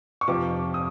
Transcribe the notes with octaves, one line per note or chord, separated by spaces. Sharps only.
C#6
F2 C3 F3 D6
D#6